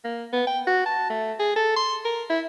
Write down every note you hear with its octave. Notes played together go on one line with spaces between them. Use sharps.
A#3
B3
G5
F#4
A5
A3
G#4
A4
C6
A#4
E4